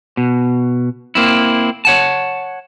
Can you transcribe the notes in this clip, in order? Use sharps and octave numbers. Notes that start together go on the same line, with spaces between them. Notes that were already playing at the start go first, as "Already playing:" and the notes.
B2
A#3 C4 E4
C#5 F#5 A5